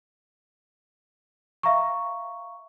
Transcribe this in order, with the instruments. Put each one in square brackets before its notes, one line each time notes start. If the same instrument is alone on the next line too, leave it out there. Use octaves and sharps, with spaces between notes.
[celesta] E5 F5 A#5 C#6